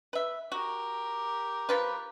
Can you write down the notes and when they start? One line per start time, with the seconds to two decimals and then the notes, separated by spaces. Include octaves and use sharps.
0.13 B4 E5
0.52 F#4 G4 A#4
1.69 F3 F4 B4